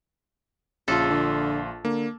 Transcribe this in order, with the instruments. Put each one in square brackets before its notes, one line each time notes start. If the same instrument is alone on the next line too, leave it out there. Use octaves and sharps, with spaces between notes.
[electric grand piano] A#1 F4 [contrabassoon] C#3 [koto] A4
[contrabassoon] D3
[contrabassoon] D3 [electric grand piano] A#3